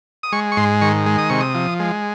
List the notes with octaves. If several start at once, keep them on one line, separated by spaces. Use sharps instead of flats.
D#6
G#3 C#6
C#6
G#2 C6
D#3 C#6
G#3
D#6
C3 C#6
D#6
F3
G#3